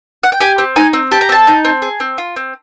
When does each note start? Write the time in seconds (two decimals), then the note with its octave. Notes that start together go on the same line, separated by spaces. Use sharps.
0.23 F#5
0.32 G5
0.40 G4 G#5
0.58 C4
0.76 D#4 G#5
0.93 C4
1.11 G4 A5
1.21 A#5
1.29 C4 A5
1.47 D#4
1.65 C4
1.82 G#4
2.00 C4
2.18 F4
2.36 C4